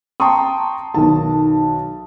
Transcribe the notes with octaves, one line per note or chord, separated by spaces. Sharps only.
G5 A5 A#5 C6 C#6 D#6
B1 D#3 A5